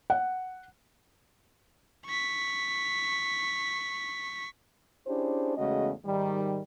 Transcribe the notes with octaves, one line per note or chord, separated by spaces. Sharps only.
F#5
C#6 B6
C#4 D4 E4 G4 G#4 C5
E2 C#3 G#3 A3 F#4 D#5
G#2 D#3 G3